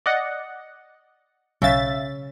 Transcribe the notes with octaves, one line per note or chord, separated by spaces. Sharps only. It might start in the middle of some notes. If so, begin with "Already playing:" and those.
D5 D#5 F#5
B1 C#3 E5 A6